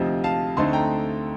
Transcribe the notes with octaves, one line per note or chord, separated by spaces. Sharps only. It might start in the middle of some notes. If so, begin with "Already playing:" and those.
Already playing: D2 C3 F3 C4 D#4
F5 A5
D2 D3 A3 C4 D#4 A5 C6
G5 A#5